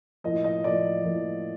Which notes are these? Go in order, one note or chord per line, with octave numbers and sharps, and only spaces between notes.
A2 F3 A#3 D#5
D#5
A2 F3 A#3 D5
A2 F3 A#3